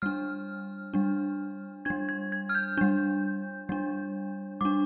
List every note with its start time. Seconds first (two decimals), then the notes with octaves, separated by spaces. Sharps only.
0.02 G3 D4 F6
0.94 G3 D4
1.85 G3 D4 G#6
2.09 G#6
2.32 G#6
2.49 F6
2.55 G6
2.77 G3 D4 G6
3.69 G3 D4
4.61 G3 D4 D6